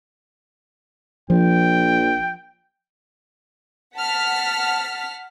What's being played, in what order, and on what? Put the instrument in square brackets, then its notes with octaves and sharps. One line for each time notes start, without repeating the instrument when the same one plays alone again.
[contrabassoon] A#1 [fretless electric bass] F3 [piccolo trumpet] G5
[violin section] F#5 A5 F6 B6